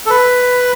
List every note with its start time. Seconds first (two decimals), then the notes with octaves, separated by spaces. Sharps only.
0.06 A4
0.10 B4